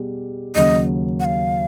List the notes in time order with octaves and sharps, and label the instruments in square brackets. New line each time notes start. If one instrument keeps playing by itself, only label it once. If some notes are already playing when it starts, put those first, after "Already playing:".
Already playing: [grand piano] B2 G3 G#4
[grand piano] D#2 C#3 F#3 [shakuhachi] D#5
[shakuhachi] F#5
F5